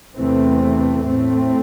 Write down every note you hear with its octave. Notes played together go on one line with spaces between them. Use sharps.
E2 C3 E3 A3 C4
A2 A3 C4